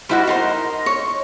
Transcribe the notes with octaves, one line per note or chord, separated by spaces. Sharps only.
G3 E4 F#4 C5 D#5 F#5
D#4 A#4 C5 C6
C#5